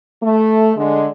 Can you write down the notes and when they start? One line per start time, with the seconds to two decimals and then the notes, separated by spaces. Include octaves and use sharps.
0.23 A3
0.77 D3 G#3